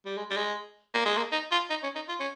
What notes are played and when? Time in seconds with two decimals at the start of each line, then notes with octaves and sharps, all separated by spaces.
0.06 G3
0.17 G#3
0.30 G3
0.37 G#3
0.94 A#3
1.05 G#3
1.17 A#3
1.32 D#4
1.51 F4
1.70 D#4
1.83 C#4
1.95 D#4
2.08 F4
2.20 C#4